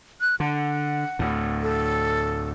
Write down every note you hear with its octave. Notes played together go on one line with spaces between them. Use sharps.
F#6
D3 F#5
D2 A2
A4